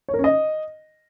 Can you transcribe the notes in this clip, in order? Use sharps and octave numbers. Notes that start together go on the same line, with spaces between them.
C#5
A#4
C#4
D#5